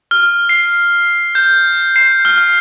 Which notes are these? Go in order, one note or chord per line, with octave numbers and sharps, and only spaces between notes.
F6
C7
G6
C7
F6